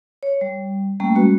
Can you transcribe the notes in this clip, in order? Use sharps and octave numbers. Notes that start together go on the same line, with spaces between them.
C#5
G3
G3 A3 A#3 C#4
G#3 F#4 B4